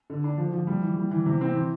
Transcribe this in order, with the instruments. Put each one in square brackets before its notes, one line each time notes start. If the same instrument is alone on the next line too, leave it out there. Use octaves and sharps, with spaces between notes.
[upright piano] D3
D4
F3
F3
G3
E3
G3
E3
C3
C4
E3